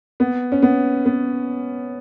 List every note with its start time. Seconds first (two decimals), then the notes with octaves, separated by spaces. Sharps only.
0.20 B3
0.52 C#4
0.63 B3
1.06 B3